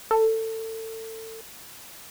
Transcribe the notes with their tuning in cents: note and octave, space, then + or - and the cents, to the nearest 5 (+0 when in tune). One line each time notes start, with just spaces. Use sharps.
A4 +25